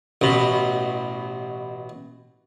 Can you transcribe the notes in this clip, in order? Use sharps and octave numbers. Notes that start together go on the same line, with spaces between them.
A1 B2